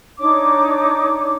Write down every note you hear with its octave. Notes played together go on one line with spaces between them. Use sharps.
D4 D#4 C#5 D6